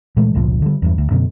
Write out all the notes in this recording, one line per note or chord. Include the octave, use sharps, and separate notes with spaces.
A#2 E3 G#3 A3
F1 C#2 A#2 F3
D3 G3
E2 G2
D2
F#2 B2 D3